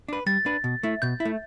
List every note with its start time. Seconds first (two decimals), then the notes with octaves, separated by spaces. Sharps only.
0.08 D4 B4
0.26 G3 A6
0.46 D4 B4
0.64 B2
0.83 A3 E4
1.02 B2 G6
1.20 E4
1.25 A3